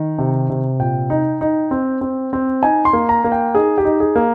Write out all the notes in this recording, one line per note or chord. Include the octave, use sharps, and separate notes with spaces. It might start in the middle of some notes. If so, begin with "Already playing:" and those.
Already playing: D#3 D#4
C3
C3
A#2 G5
D#4
D#4
C4
C4
C4
D#4 G#5
C6
A#3
A#5
A#3
G5
D#4 G#4
G4
D#4
G#4
A#3